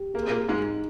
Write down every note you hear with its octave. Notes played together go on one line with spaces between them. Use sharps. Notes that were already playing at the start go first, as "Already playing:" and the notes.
Already playing: G4
A#3 G#4
C4
A#2 A#3
G#2 G#3 D#4